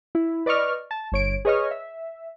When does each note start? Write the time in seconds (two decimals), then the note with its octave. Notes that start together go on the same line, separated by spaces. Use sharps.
0.15 E4
0.46 B4 D5 D#5 C#6 F6
0.91 A5
1.12 G1 C#5 D7
1.45 G#4 B4 C#5 D#5 C#6 F6
1.71 E5